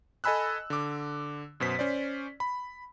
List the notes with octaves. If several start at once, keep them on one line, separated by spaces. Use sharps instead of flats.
A4 D#5 G#5 B5 E6 F#6
D3 D6
F#2 B2 C5 B6
C#4 C5 D5
B5